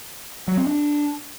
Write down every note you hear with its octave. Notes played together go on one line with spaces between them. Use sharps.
F#3
C4
D4